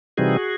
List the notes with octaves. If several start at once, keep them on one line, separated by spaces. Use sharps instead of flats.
C3 E3 G3 C4 D#4 F#4 G#4